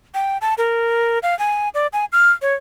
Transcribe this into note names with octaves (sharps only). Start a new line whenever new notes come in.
G5
A5
A#4
F5
G#5
D5
G#5
F6
C#5